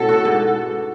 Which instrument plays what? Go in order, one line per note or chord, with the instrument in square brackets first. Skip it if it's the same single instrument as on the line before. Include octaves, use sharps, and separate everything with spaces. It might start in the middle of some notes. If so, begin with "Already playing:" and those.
Already playing: [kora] B2 A3 C#4 E4 [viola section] A4
[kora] F#4
G#2